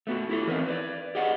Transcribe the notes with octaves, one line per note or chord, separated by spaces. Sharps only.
A3 B3 F#4
E4 G4 A4
E3 B3 C4 D#4 A#4 B4
B4 C5 D5
G4 G#4 D#5 F#5